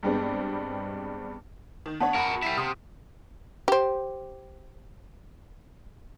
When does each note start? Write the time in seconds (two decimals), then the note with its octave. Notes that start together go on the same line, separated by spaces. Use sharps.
0.03 G2 G3 G#3 B3 C4 D4
1.86 D#3
2.00 B3 D4 C#5 F#5 A5
2.14 E2 F#4 A#4 B5
2.42 G3 E4 B6 C7
2.57 C3 C6 D#6 F6
3.68 G4 C5